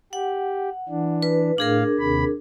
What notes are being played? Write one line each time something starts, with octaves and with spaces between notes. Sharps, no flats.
G4 F#5
E3 D4
B4
A2 D4 G#4 A#4 F5
D#2 C3 B5